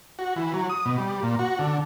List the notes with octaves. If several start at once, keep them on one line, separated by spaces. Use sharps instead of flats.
F#4
E3
F#3
D#6
B2
G3
A#2
F#4
D3